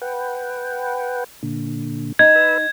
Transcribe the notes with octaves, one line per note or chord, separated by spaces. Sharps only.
B4 F#5 G5
A#2 D3
D#4 G#6
B4 B5 E6